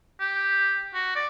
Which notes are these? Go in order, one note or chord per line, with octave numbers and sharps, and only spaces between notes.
G4
F#4
D5